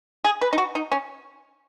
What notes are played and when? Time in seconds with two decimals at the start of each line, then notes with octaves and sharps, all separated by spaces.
0.24 G#4
0.41 B4
0.53 D#4
0.58 F#4
0.75 D#4
0.92 C#4